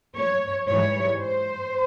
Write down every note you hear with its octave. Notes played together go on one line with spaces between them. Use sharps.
C#5
G#2 E3 G3 C#5
C5